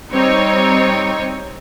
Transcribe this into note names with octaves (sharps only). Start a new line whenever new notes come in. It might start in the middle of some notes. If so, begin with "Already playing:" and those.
G3 C4 D#4 C#5